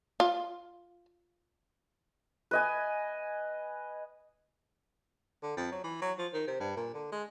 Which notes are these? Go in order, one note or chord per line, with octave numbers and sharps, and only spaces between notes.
F4
B4 D#5 G#5
D3
F2
F#3
E3
F#3
F3
D#3
C3
G2
A#2
D3
G#3